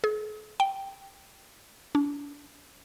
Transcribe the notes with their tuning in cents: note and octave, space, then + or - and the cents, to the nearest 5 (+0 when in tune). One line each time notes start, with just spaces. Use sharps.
G#4 +45
G5 -5
D4 -40